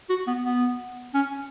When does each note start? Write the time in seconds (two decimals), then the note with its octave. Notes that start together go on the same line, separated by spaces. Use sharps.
0.10 F#4
0.27 B3
0.45 B3
1.14 C#4